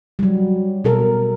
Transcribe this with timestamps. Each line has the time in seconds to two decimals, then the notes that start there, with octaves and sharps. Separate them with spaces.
0.19 F#3 G3
0.84 B2 A4 A#4